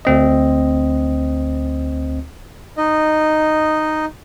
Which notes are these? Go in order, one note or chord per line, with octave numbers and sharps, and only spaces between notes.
D2 C4 D#5
D#4 D#5